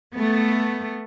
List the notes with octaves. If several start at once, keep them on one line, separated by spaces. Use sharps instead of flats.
A3 B3